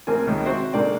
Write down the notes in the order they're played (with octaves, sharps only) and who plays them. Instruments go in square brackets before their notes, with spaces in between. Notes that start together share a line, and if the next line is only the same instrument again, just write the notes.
[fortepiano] A1 A#3 C4 A#4 G#5
C#2 D#3
C4 F#4 C5 E5
G#2 D3 A#3 D5 G5